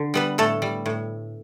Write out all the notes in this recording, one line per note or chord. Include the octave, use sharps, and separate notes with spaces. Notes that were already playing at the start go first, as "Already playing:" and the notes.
Already playing: D3
G3 B3 B4
A2 A3 A4
G3
A2